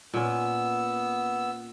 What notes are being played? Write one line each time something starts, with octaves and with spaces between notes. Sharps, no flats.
A#2 B3 C#4 E6